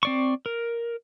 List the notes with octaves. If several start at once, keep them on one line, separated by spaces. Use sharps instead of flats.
C4 D5 C#6
A#4